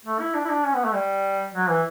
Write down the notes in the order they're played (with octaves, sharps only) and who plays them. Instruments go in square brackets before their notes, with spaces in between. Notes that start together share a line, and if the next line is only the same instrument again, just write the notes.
[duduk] A3
E4
D4
E4
D4
C#4
B3
A3
G3
F#3
E3